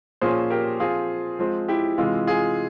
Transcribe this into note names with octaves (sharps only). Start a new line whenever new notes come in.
A#2 F3 A#3 C#4 G#4 C5
G4 A#4
F3 C4 F4 G#4
F3 G#3 C4
E4 G4
C3 E3 G#3 F4
F4 G#4